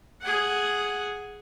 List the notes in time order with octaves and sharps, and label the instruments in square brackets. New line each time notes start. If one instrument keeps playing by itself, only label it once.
[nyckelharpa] G#4 F#5